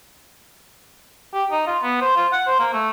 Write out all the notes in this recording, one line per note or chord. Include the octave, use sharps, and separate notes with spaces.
G4
D#4
F4
B3
C5
F4
F#5
C5
A#3
A3